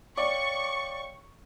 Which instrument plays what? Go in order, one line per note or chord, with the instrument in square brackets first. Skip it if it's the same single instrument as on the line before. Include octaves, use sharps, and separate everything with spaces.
[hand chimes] C#5 F5 G5 [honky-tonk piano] D5 [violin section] C#6